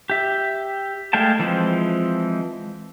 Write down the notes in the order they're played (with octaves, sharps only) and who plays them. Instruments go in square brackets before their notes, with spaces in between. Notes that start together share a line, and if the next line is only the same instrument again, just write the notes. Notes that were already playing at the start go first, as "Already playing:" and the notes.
[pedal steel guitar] G4 E5
G#3 A3 F5 G5 A5
E3 F3 G#3 C4